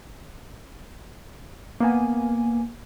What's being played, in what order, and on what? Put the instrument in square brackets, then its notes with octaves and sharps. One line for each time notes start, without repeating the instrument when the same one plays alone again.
[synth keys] A#3 B3 G#5